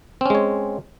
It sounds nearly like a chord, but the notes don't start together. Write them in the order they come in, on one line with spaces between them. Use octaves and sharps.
C4 C#4 G#3 C#5